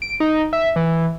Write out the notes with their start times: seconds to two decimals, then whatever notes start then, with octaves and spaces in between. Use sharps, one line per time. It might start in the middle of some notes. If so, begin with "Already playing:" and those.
0.02 D7
0.20 D#4
0.53 E5
0.76 E3